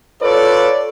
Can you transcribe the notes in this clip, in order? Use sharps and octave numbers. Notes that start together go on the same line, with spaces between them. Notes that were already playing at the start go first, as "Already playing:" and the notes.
F4 A4 B4 C#5 D5